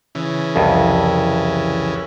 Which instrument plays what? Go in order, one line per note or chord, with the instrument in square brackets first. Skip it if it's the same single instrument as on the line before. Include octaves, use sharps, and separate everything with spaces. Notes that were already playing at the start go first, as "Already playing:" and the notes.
[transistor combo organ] C#3 E3
[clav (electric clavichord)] C2 F2